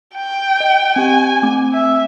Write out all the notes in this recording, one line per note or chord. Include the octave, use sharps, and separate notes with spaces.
G5
D#5
C4 G4 G#5
A3 C4 D6
E5